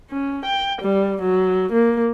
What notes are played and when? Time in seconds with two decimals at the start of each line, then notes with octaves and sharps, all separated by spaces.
0.11 C#4
0.46 G5
0.82 G3
1.22 F#3
1.73 A#3